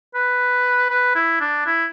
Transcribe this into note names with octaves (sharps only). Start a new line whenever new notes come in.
B4
B4
E4
D4
E4